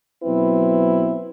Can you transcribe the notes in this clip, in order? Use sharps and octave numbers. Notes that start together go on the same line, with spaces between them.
B2 F#3 C4 E4 B4